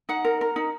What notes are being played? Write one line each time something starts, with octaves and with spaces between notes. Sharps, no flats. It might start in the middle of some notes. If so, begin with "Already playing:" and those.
D#4 F#5
A#4
A#4
D#4